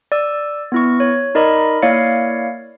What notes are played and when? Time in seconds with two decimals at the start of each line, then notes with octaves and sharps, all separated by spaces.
0.12 D5 E6
0.72 B3 E4 C#6
1.00 C#5
1.35 D#4 A#4 D5 D#5 B5
1.82 A#3 E4 C#5 D5 F5 C#7